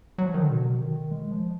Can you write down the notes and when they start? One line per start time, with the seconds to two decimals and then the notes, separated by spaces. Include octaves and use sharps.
0.18 F#3
0.27 F3
0.34 D#3
0.42 D3
0.50 B2
0.81 D#3
1.11 G#3
1.31 F3